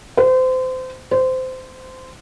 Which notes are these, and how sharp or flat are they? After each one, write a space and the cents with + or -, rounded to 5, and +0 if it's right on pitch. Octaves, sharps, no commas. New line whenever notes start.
C5 -30
C5 -20